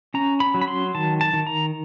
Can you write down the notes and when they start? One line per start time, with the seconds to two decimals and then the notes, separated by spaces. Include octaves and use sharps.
0.14 C#4 A#5
0.40 B5
0.54 F#3
0.62 B5
0.68 C6
0.95 D#3 A5
1.21 A5
1.33 D#3
1.47 A#5